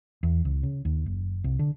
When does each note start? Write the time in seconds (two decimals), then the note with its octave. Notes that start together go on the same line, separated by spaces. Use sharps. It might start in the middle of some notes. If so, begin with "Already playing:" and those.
0.23 E2
0.45 C#2
0.63 C#3
0.85 D#2
1.06 F#1
1.44 C2
1.59 D3